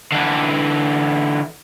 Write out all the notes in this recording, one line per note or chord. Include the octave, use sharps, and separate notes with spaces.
D3 E3